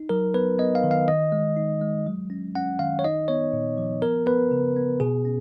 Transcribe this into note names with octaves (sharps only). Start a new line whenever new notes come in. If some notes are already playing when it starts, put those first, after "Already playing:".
Already playing: D#4
F#3 A#4
B3 B4
B3 D#5
F5
D#3
F5
D#3 D#5
G#3
D#4
G#3
F#3
C#4
C#4 F#5
D#3 F5
C#5
D#4 D#5
B3 C#5
A#2
F3
B3 A#4
B3 B4
C#3
B3
B2 G#4
C#4